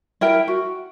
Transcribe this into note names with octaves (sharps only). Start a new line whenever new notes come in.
E4 A#4 G5
F#4